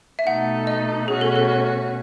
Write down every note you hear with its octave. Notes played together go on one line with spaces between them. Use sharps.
E5
B2 A3 D#4 A4 F#5
D#5
B2 A3 C#4 F#4 G#4
A4
A4